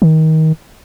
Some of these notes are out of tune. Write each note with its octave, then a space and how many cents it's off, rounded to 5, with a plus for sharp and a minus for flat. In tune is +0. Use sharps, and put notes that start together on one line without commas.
D#3 +25